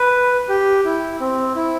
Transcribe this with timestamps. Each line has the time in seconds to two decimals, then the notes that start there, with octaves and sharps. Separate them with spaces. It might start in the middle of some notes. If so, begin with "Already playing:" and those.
Already playing: B4
0.49 G4
0.84 E4
1.20 C4
1.56 E4